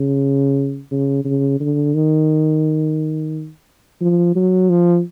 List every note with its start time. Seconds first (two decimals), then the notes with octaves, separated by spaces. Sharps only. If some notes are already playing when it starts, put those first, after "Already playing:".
Already playing: C#3
0.91 C#3
1.25 C#3
1.60 D3
1.94 D#3
4.01 F3
4.36 F#3
4.70 F3